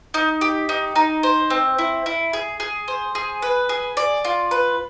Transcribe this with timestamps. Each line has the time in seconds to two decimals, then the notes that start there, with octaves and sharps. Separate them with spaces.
0.14 D#4
0.41 G4
0.69 D#4
0.96 D#4
1.23 C5
1.50 C4
1.79 E4
2.06 E4
2.33 G#4
2.60 G#4
2.88 C5
3.15 G#4
3.42 B4
3.69 G#4
3.97 D5
4.25 F4
4.51 B4